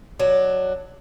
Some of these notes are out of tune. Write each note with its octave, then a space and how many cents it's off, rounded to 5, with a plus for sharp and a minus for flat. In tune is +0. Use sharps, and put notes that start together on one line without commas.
F#3 +0 D4 +20